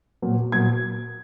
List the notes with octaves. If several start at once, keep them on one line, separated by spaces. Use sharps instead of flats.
A#2 F#3 A#3
A#2 F#3 A#3 G#6